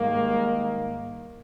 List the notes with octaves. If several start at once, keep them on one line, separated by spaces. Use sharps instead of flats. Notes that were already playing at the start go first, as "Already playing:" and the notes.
Already playing: G#2 D#3 G3 A#3